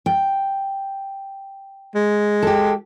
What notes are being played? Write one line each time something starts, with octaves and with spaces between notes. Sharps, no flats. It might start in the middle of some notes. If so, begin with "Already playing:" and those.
G5
G#3
G4 A4